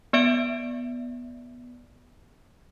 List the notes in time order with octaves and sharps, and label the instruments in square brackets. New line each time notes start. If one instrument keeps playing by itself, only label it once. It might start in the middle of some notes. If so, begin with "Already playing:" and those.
[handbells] B3 D5 E5 D7